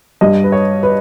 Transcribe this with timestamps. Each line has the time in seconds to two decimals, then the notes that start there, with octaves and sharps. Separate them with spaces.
0.21 G2 G3 D#5
0.44 B4
0.52 C#5
0.83 B4